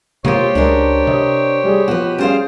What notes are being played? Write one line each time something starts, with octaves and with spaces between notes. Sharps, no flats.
C3 G#3 A#3 F4 G4 C5 C#5
C#2 G#3 D4 A#4
C3 D#5
G3 G#4
B2 F3 F#4 B4
G3 C#4 G#4 C5 F5